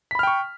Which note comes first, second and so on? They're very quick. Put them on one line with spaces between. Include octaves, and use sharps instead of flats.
B6 B5 F6 G5 C#6